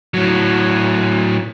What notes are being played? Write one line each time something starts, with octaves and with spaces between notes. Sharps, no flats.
A2 F#3